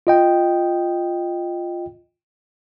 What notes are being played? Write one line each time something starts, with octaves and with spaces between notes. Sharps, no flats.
F4 D#5 G5